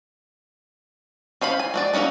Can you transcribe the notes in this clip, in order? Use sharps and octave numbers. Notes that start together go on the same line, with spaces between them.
C#4 C5 F5 B5
G#5
G#3 F#4 D5
F#3 G#3 A#3 C#4 D#4